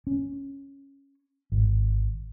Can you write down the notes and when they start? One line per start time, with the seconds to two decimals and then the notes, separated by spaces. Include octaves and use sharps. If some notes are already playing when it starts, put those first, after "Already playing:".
0.07 C#4
1.52 G#1